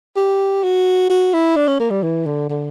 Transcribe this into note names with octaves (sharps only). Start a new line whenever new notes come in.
G4
F#4
F#4
E4
D4
C#4
A#3
G3
E3
D3
D3